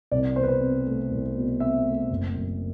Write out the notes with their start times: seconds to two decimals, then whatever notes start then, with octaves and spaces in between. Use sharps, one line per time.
0.11 C2 D5
0.36 B2 C5
0.43 B4
0.48 C5
0.61 C4
0.86 A3
1.11 C2
1.36 B2
1.60 C4 E5
1.86 A3
2.10 F#1
2.35 F#2